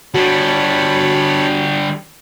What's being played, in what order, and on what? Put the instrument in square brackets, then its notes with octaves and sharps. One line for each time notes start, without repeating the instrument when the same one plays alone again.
[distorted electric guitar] D3 G3 [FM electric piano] F#4 [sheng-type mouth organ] C#5 A5 B5